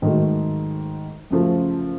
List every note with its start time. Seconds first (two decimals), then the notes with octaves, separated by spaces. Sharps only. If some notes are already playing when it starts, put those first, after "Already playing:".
0.02 G#2 D#3 F#3 A3
1.31 F#2 C#3 F3 A3